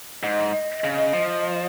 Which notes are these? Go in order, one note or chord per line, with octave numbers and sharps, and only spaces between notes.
G#2 D#5
C#3
F3